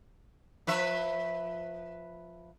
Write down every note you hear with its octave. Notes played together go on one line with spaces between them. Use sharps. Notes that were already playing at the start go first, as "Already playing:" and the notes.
F3 B4 E5